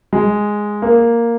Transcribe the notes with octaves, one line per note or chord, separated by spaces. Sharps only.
G#3
A#3